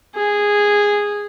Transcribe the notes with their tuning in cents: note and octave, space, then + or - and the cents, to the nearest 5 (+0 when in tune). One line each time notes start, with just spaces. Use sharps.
G#4 -10